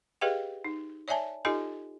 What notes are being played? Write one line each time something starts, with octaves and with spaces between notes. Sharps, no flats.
G4 G#4 B4 D#5 F5 G5
D#4
C#5 D5 E5 G#5 A5
D#4 F4 G4 A4 D#5 G#5